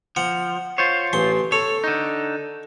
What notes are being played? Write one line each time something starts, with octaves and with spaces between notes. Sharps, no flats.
F3 F#5
F4 C5 C#5
A1 C6
A4 C#5
D3 D#4